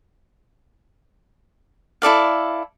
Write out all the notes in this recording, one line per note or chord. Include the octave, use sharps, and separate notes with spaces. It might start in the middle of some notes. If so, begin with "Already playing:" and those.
E4 A4 D5 F5